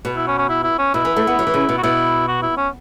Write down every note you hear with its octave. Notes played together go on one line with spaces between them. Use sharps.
B2
E4
C#4
C#4
E4
E4
C#4
B2 E4
E3
A3
B3
F#3
E3
C#3
B2
F#4
B2 E4
F#4
E4
C#4